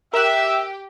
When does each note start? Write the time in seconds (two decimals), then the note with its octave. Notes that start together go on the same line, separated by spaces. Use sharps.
0.13 G4 A#4 E5 E6 F#6